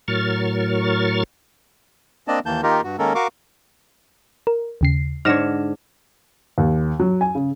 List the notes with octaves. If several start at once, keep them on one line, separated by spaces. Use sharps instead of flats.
A2 F#3 A#4 C#6 F6 A6
A#3 C4 D4 D5 D#5 A5
D#2 D#3 E3 A#3 A5 G6
D#3 A#3 D#4 F4 G4 A#4
G2 F#4
D#3 G#3 A#3 C#4 A4 A#4
F#4 A#4 F5 C#6 D6
A#4
D#2 C#3 C7
G#2 D3 C#5 F6 A#6 E7
D#2
F#3
G#5
C#3